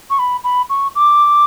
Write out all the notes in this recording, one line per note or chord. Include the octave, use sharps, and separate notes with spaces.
C#6
B5
B5
C#6
D6